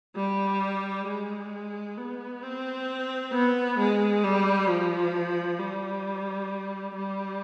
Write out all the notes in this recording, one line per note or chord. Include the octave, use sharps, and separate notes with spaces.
G3
G#3
B3
C4
B3
G#3
G3
F3
G3
G3